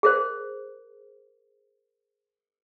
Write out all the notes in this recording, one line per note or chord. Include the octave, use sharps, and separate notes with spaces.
G#4 A#4 C5